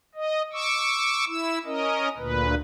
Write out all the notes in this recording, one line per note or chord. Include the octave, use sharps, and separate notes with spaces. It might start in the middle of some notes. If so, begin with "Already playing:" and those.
D#5
C#6 D6 E6
E4 E6
C#4 A#4 D#5
D2 A#2 B4